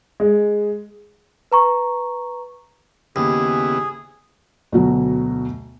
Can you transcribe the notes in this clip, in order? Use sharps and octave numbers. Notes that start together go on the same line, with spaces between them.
G#3
B4 A#5 C#6
D#2 C#3 B3 E4 G#4
D2 B2 F#3